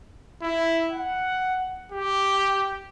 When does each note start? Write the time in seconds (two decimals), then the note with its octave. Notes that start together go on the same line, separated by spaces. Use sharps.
0.42 E4
0.91 F#5
1.92 G4